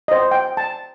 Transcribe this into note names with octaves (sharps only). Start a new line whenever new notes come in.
D#5
C5
G5
A5